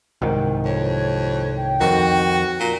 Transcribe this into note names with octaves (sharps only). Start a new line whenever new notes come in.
C2 G#2 D#3
F2 C#5
G5
F2 D#3 F#4
A#2 A#5